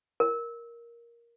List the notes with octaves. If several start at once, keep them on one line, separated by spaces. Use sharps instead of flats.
A#4